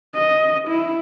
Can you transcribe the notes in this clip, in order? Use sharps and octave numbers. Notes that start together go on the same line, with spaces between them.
D#5
E4